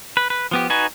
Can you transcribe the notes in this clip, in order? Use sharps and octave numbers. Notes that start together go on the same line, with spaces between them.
B4
B4
F3 B3 G4
D#4 F#4 B4 G#5